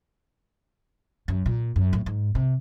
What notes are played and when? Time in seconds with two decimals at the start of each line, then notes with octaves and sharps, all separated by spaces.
1.28 F#2
1.46 A#2
1.76 F#2
1.93 A2
2.06 G#2
2.35 C3